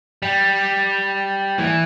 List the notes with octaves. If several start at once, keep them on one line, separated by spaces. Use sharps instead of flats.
G3
E3